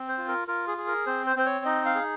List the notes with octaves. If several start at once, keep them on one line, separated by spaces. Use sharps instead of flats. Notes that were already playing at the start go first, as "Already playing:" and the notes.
Already playing: C4
C5
F4
A#4
F4 A#4
G#4
G#4
A#4
C4 C5
C5
C4 C5
C#5
D#4 D#5
F5
G#4